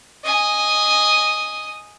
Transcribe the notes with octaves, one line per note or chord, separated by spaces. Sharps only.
D#5 G#5